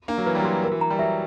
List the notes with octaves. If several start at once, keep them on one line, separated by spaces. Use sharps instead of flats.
A#3 D4
F#3
E3 B4
G3
F#3
F#4
A#4
E3
A#5
G3
F#3 E5